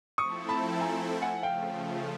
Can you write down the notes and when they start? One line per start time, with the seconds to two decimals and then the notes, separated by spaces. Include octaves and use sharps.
0.18 F3 A3 C4 E4 A4 C#6 D#6
0.49 A5 B5
0.81 G#5 A#5
1.22 F#5 G#5
1.43 C#3 F3 A3 F5 G5